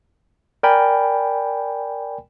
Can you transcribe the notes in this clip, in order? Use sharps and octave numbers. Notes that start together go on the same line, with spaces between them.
A#4 D5 G5 G#5 B5